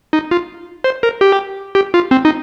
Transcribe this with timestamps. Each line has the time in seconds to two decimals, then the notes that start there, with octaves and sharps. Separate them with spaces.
0.13 D#4
0.31 F4
0.84 C5
1.03 A#4
1.21 G4
1.75 G4
1.94 F4
2.11 C4
2.25 D#4